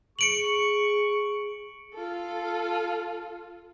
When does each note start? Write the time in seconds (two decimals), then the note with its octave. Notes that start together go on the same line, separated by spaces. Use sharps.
0.19 G#4 C#6 C#7 D7 F#7
1.94 F4 A4